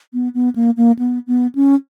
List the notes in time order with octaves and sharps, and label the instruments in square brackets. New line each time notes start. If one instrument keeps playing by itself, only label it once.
[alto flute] B3
B3
A#3
A#3
B3
B3
C#4